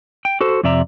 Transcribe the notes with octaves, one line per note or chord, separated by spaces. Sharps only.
G5
F#4 A4 C5
F2 C3 D5 E5 A#5